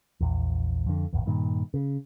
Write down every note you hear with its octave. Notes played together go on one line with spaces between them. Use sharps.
A#1 E2
F2 D3
D#1 G#1 E2
G2 A#2 D#3
C#3